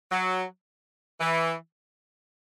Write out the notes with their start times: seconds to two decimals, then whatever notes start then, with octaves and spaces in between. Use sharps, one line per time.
0.11 F#3
1.20 E3